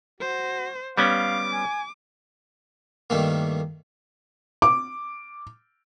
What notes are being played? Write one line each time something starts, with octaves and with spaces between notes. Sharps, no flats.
F#4 C5
G3 B3 C#4 F5 D6
G#5
G2 D#3 A3 A#3
D6